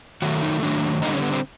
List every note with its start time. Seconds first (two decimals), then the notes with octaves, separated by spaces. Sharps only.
0.22 D#3 F#3 A3 F#4
0.42 D#4
0.63 D#3 F#3 A3 D4
1.02 D3 G3 A#3 D#4
1.13 C#4
1.22 B3
1.33 C4